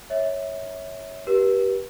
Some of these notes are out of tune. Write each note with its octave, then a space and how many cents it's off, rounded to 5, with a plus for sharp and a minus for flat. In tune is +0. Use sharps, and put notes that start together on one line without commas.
C#5 +0 E5 -20
G4 -15 B4 -40